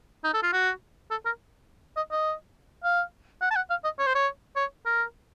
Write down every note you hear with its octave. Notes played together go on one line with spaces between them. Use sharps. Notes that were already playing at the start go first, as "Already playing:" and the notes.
D#4
A4
F4
F#4
A4
A#4
D#5
D#5
F5
F#5
A5
F#5
F5
D#5
C#5
C5
C#5
C#5
A#4